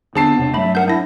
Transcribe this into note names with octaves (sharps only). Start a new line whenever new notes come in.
D3 B3 C4 D4 G#4 A5 C7
E1 C3 D4
G2 F#3 A3 E5 B5
A#4 F#5 G6
D4 E4 A#6